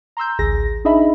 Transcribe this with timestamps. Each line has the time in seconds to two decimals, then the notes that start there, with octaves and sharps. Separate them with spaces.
0.17 A#5 C6 E6 G6
0.39 A1 D2 G#4 A#6
0.85 D4 D#4 G#4 D#5 E5 B5